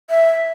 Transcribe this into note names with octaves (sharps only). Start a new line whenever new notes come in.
E5